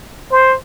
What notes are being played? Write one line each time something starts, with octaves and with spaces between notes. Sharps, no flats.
C5